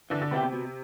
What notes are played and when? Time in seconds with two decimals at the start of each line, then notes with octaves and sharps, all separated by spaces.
0.10 D3 E3
0.21 D3
0.31 C3 B3 E4 G4
0.43 C3
0.53 B2